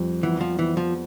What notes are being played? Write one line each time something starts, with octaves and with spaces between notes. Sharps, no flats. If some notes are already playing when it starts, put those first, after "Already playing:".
Already playing: F2 G3
E3 B3
F3
E3 B3
F3